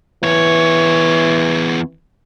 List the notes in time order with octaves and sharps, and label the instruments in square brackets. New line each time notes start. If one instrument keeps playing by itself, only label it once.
[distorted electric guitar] E2 C#5 [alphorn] E3